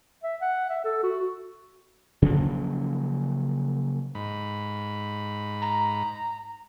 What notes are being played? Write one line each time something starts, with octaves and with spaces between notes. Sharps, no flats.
E5
F#5
E5
A4
F#4
C#3 F3 F#3 A#3
G#2 B5
A#5